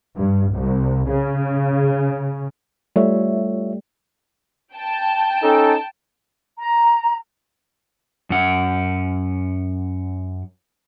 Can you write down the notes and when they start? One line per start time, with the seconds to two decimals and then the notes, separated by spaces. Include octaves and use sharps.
0.15 G2
0.54 C2
1.10 C#3
2.96 G3 A3 F4 C#5 E5
4.74 G5 A5
5.43 C#4 D#4 A4
6.59 A#5
8.30 F#2 F#5